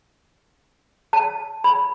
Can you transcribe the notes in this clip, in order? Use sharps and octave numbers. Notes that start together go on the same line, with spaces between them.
A5
B5